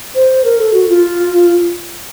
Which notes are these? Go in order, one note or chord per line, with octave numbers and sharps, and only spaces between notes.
C5
A#4
A4
F#4
F4